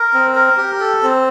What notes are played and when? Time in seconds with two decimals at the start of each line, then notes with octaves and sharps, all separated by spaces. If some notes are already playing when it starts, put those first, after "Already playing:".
Already playing: A#4
0.14 C4
0.35 A#4
0.57 G4
0.80 A4
1.03 C4